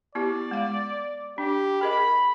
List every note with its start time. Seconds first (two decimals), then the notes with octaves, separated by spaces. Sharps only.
0.15 B3 E4 G4 D5
0.51 G#3 F5
1.38 D4 G4
1.81 G#4 A#4 D#5 B5